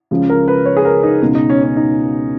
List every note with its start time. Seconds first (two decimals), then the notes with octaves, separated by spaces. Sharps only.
0.11 C#2 C#3 F3 G#3
0.29 A#4
0.48 B4
0.66 C#5
0.77 G#4
0.85 A#4
1.03 D#4
1.21 C#2 B2 G#3 D#4
1.35 D#4
1.49 C#4
1.63 C#4
1.77 D#4